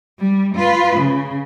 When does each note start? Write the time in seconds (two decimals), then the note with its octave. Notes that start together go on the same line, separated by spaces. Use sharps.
0.19 G3
0.55 F4 B4
0.96 C#3